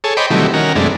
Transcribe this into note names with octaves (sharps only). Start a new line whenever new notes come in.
G#4 A4 C#5
C5 C#5 D#5 G5 B5 D6
C3 D#3 E3 F#3 G3 A3
D#3 C#4 F#4 A#4
F#2 C3 E3 G#3 A3 D4